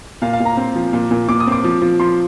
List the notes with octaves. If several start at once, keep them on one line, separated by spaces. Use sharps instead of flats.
A#2 F5
F5
A#2
A#5
C4
F3
A#2
A#2
A#2 D6
D#6
C4 D6
F3
F3
F3 C6